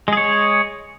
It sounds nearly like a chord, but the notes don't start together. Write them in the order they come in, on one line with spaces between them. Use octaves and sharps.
G#3 G#4 C#5